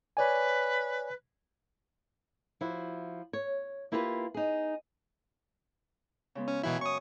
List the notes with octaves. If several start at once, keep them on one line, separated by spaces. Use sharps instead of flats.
B4 C#5 D5 G#5
F3 E4 F#4
C#5
A#3 E4 F4 G4 A#4 B4
D#4 G#4
C#3 G#3 B3
C#4
F#2 B2 E3 E4 G#5
C#4 C#5 C#6 D#6